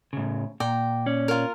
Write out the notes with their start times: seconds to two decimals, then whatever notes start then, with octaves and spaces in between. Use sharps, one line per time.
0.13 A2 C#3
0.60 A#2 D5 G5 A#5
1.06 C#4 C#5 D5
1.28 F4 A#4